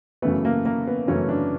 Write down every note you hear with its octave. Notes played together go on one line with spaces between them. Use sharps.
F#2 C#3 E3 A3 B3
A#3
A#3
B3
F#2 C#3 E3 A3 C#4
D4